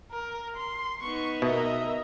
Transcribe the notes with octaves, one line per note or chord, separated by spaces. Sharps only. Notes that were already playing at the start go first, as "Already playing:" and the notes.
A#4
C6
B3 D#4 C#6
B2 A#4 D#5 E5 A#5